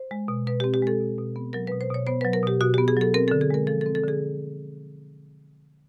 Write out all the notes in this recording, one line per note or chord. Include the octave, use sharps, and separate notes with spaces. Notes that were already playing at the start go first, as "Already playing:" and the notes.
Already playing: C5
G#3
B2
B2 B4
C4 G4
G4
G#3 A4
B2
B2
B3
F#3 A#4
B2 B4
C5
B2 C#5
B3 C5
F#3 B4
A#4
B2 G4
B2 F#4
B3 G4
G#4
F#3 A4
C4 A#4
D3 A4
G#4
G#3 A#4
F3 A4
A4
C4
A4
D3 G#4